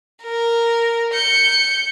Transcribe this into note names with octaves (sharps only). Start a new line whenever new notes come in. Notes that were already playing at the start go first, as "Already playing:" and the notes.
A#4
G6 C#7